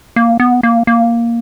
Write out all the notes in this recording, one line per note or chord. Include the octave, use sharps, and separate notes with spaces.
A#3
B3
A#3
A#3